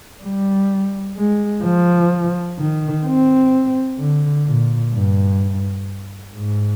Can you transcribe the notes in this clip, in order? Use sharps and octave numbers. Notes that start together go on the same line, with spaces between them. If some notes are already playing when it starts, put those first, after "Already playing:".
G3
G#3
F3
D#3
C4
D3
A#2
G2
G#2